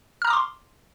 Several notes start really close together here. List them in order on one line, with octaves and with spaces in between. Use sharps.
F6 A#5 D#6 D6 C6